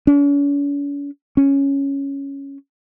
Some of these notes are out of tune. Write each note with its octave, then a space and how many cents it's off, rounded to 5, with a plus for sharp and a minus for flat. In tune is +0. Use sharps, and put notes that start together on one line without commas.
C#4 +45
C#4 +0